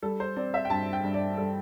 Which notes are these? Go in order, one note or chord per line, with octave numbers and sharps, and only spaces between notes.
G3 A4
C5
C4 D5
E5
G5
G2 A5
G5
G2
D5
G3 A4